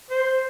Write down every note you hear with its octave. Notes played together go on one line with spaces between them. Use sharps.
C5